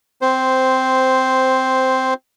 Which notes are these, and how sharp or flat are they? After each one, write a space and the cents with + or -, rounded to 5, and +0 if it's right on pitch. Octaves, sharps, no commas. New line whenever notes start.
C4 -10 C5 +0